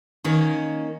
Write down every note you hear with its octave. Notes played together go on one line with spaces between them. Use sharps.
D#3 A#3 C#4